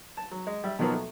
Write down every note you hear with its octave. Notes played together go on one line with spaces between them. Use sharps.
A5
F#3
G#3
G3 E5
B2 D#3 F3 F#3 A#3 B3
A3